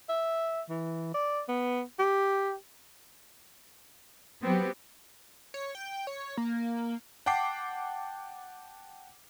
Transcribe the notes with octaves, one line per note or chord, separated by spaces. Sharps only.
E5
E3
D5
B3
G4
F#3 B3 C4 G4
C#5
G5
C#5
A#3
F#5 G5 A5 D6 C7